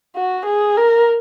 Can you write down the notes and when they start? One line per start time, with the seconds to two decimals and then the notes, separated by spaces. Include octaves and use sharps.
0.15 F#4
0.46 G#4
0.77 A#4